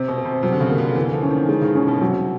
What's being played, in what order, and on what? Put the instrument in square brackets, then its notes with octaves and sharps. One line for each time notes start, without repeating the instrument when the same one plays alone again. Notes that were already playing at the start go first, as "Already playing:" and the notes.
Already playing: [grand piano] C3 [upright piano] C4
[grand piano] B2
[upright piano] C4
[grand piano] C3
[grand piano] C3 [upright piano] F#3
[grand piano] D3
C#3
[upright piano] A#3
[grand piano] D3
[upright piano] D3 [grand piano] E3
[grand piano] F3
[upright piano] C#4
[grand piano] D#3
[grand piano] D#3 [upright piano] G#3
[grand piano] C#3
[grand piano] B2 [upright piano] C#4
[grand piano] B2
[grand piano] C3 [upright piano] F#3